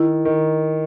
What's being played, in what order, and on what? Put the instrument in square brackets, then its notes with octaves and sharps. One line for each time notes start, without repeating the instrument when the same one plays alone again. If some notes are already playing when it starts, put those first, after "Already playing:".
Already playing: [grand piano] D#3 [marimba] E4
[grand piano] D#3